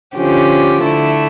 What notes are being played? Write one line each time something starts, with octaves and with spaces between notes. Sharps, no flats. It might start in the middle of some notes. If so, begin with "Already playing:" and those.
D3 F3 C#4 G4
D3 A3 E4